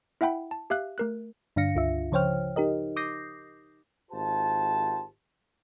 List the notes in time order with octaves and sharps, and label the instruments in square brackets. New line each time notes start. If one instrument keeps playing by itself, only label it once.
[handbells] E4 E5 F#5 G5 B5
A5
G4 E5 F5 F#6
A3 A#4 F#6
[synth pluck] G2 D3 D4 F5 A#6 C#7
C#2 F4 E5
C#3 F3 C5 C#5 G5 F6
D#4 G4 A#4 D#5
D6 D#6 G6 A#6 C7
[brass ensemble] G#1 F4 G4 C5 A5